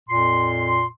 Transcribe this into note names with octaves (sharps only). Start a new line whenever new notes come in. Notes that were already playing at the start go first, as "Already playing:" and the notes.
F2 A#2 C6